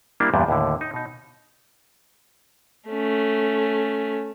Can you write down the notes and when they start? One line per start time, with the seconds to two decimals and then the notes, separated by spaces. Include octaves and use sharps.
0.20 G3 A#3 D4 E4
0.34 E2 G2 A#2 G3 B3
0.48 D#2 A2 D3
0.81 D#4
0.94 B2 D#4
2.90 A3 C#4